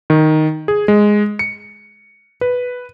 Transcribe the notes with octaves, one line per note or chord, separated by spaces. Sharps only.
D#3
G#4
G#3
C#7
B4